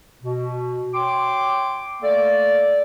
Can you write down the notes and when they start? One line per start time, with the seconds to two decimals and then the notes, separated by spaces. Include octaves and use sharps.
0.23 B2
0.94 C#5 G5 C6 D6
2.02 A3 A#3 A4 D5